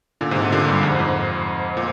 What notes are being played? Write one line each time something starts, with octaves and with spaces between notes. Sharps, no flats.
A#2 D3
G#2 C3
A#2 D3
A#2 D3
G2 A#2
F2 G#2
F2 G#2
A#2